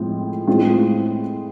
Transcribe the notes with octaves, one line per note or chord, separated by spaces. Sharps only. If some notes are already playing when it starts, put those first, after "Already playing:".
Already playing: A2 F3 G#3 C4
A2 G#3 C4 F4